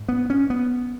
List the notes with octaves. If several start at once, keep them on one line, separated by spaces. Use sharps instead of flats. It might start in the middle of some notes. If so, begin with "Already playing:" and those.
Already playing: G#2
B3
C#4
B3